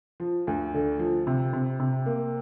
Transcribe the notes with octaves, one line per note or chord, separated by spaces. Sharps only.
F3
D2
D3
F3
C3
C3
C3
A#3